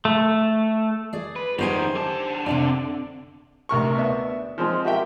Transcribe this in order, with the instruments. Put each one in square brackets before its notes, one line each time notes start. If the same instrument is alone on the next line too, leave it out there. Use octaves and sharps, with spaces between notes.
[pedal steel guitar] A3
[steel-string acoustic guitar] G#4 D5
[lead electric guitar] B4
[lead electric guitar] F#2 D#3 [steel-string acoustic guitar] G4 C5 G#5
[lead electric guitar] D3 A5
[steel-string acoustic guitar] C3 D4 D5
[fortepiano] D2 C3 A#4 C#6
B3 D4 E5
F3 G#3 C4
F#4 G4 A#4 E5 G5